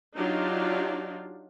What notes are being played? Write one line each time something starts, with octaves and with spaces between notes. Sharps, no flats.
F#3 D4 D#4 F4 G4